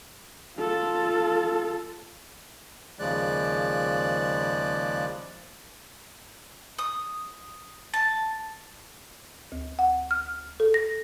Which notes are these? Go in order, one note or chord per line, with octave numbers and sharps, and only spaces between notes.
F4 A4
D#2 C#3 F3 G#3 D5 F#6
D#6
A5
D2
F#5
F6
A4
A#6